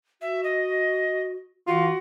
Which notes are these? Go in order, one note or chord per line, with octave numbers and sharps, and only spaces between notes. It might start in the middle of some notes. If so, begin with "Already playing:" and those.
F#4 E5
D#5
E3 F4 F#4